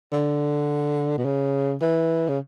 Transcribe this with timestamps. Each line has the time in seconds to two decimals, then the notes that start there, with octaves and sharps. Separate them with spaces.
0.13 D3
1.18 B2
1.26 C#3
1.82 E3
2.29 C#3